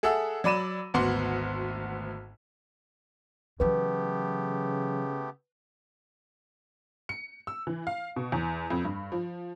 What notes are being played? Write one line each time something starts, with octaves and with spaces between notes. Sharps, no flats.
G#4 A4 E5 F#5 E6
F#3 D5 B5 D#7 E7
G#1 D2 B3 F#4 F#5 C6
C#3 E3 F#3 A3 B3 G4 B4
C#7
E6
E3
F5
B2
E2
F2
G2
F3